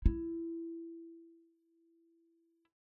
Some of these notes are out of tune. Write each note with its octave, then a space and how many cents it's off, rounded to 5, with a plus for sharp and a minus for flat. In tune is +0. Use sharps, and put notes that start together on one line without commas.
E4 +15